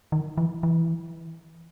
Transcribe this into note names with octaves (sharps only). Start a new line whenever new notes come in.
D#3
E3
E3